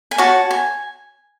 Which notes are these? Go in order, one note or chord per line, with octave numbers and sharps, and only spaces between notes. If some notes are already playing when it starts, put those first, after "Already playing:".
G#5
F#4 C#5 A5
G#5